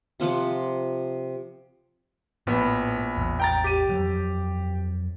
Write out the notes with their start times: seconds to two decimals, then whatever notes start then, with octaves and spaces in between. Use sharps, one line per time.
0.20 C3 F3 F#5 D6
2.47 A#1 A2 B3
3.17 A1 E2
3.40 G5 A#5 A6
3.64 G4 D#7
3.89 F2 F#3